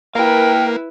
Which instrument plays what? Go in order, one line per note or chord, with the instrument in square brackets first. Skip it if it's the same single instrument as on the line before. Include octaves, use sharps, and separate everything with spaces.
[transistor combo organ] A#3 [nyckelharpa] E4 B4 [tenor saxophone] A#4 [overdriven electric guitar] F5 G5